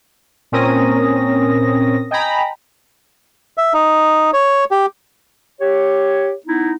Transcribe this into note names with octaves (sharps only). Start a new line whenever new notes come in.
A#2 C4 C#4 A#4 D#6 A#6
D#5 G5 G#5 A#5 B5
E5
D#4
C#5
G4
G4 C#5
B3 D#4 E4